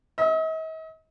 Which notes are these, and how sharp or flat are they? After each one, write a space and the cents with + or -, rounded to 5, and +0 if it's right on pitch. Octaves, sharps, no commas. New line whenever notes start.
D#5 +45 E6 +0